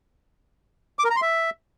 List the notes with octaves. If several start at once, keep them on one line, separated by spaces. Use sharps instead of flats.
D6
A#4
A#5
C6
E5